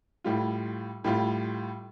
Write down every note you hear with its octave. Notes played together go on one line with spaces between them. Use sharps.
A2 G3 F4
A2 G3 F4